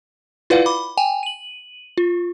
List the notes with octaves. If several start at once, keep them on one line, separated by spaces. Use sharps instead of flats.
E4 F4 B4 D5 F5 F#5
B5 D6
G5 G#5 F7
D#7 F#7
F4